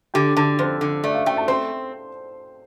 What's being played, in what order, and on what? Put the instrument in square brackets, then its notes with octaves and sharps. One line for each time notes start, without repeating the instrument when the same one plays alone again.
[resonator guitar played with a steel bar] D3 [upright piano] G4 G5
[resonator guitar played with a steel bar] D3 [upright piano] A4 A5
[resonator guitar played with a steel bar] F2 [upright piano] C5 C6
[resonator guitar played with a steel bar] D3
[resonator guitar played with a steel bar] A3 [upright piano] D5
[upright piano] F5
[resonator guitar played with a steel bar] A3 [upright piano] G5
[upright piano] A5
[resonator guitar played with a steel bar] C4 [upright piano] C5 C6